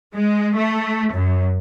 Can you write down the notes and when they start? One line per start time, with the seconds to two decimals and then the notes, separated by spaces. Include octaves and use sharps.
0.15 G#3
0.57 A3
1.13 F#2